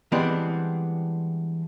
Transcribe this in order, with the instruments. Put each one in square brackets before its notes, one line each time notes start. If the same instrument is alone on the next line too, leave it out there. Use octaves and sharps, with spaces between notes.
[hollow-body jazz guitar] E3 G3 G#3 B3 C4 D4